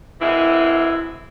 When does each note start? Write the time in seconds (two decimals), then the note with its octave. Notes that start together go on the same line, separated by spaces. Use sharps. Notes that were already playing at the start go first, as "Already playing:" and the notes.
0.21 F#2 E3 G#3 C4 E4